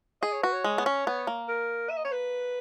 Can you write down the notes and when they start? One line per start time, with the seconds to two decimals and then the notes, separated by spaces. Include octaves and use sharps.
0.21 G#4 D#5
0.32 C#5
0.43 F#4 B4
0.53 C#5
0.64 G#3
0.78 B3
0.86 C#4
1.07 B3
1.27 A#3
1.48 A#4
1.90 E5
1.97 D#5
2.05 C#5
2.12 B4